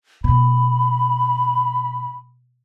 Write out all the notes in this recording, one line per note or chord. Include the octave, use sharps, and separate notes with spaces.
B2 B5